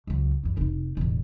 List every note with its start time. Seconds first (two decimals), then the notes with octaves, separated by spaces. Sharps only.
0.07 C#2 F#3
0.43 F#2 E3
0.57 F1 D#4
0.97 E1 A1